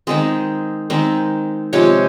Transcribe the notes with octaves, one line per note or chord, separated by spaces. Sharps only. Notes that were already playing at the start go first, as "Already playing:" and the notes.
D#3 G#3 C4 G#4
D#3 G#3 C4
C3 F3 G#3 C#5